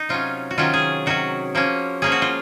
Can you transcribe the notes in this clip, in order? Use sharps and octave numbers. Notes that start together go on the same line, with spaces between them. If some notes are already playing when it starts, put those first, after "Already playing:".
Already playing: D#4
C3 F#3 C#4 F4
F#4
C3 D#3 F#3 C#4 F4
G#4
C3 D#3 F#3 C#4 F#4
F3 A#3 C#4
F3 A#3 C#4 G#4
F#4
F4